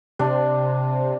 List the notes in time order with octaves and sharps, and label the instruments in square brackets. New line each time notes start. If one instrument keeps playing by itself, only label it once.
[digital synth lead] C3 [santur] D4